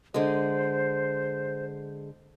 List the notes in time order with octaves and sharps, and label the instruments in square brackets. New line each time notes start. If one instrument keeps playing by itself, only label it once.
[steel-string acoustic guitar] D3 G#3 [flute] C5